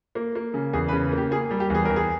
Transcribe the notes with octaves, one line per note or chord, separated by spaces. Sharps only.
A#3
A#3
C#3
E2 G#4
B4
C#3
A#3
G4
A#3 G#4
G3
G4
E2 G#4
E2 A#4
G#4